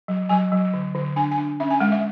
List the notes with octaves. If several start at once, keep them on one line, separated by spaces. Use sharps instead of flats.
F#3
F#3 G#5
F#3
D3
D3
D4 G#5
G#5
D4
C#4 E5
G#5
G#3 F#5
E5